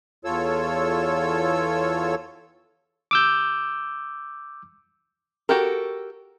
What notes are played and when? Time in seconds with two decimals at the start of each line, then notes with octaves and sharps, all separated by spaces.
0.25 E2 F4 A4 C#5 E6
3.11 D6 E6 G6
5.49 F#4 G4 A4 A#4